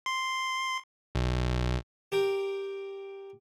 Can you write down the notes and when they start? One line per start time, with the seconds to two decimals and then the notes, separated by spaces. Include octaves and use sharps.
0.06 C6
1.15 B1
2.12 G4 A#4 G5